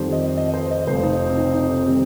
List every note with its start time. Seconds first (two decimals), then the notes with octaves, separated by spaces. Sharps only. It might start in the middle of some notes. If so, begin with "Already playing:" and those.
Already playing: F2 D#3 G3 C5
0.12 D#5
0.37 D#5
0.54 C5
0.71 D#5
0.87 F1 F2 F3 C5
1.03 D#4
1.29 C4
1.37 D#4
1.53 D#4
1.70 C4
1.87 D#3 G3 C4